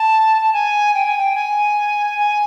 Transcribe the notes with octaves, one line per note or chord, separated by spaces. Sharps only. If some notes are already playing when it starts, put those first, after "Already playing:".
Already playing: A5
A5
G#5
G5
G#5
G5
G#5
G#5